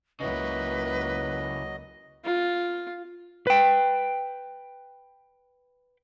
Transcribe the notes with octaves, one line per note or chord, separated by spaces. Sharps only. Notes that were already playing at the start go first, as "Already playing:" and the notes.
C#2 C#3 F#3 A#3 E4 B4 D#5
F4
B4 G5